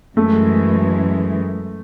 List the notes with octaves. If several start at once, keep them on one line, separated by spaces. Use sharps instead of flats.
F#2 E3 G#3 A3